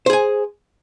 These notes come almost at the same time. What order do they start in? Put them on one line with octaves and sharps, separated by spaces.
C5 G#4 G#5